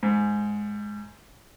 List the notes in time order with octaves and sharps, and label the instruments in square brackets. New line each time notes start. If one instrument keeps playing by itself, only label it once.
[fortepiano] G#2